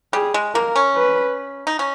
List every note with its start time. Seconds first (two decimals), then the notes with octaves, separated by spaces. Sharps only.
0.13 G3 G#4
0.34 G#3
0.55 A#3 A#4
0.76 C#4
0.96 B4
1.67 D#4
1.79 C#4